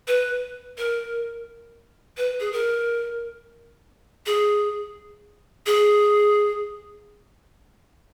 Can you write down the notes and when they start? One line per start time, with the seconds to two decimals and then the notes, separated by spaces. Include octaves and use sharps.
0.08 B4
0.78 A#4
2.17 B4
2.40 G#4
2.52 A#4
4.26 G#4
5.66 G#4